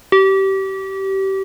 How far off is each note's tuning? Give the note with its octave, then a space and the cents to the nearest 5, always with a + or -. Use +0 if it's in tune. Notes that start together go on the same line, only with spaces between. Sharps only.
G4 -25